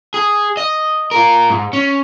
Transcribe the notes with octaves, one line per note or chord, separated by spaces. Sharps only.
G#4
D#5
F4 A#4
G#2
C#4